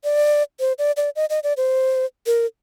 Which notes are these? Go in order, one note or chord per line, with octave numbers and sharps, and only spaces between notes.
D5
C5
D5
D5
D#5
D#5
D5
C5
A#4